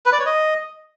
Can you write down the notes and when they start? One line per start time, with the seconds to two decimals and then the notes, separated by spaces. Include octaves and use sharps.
0.06 B4
0.12 D5
0.19 C#5
0.26 D#5